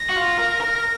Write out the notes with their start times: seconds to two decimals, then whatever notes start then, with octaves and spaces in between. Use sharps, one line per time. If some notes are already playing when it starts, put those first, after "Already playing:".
Already playing: A#6
0.09 F#4
0.16 F4
0.38 A#4
0.61 A#4